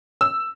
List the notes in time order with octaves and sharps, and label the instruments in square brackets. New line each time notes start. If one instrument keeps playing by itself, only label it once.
[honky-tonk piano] E6